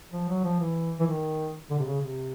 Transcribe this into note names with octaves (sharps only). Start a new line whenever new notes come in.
F3
F#3
F3
E3
E3
D#3
D3
C3
C#3
C3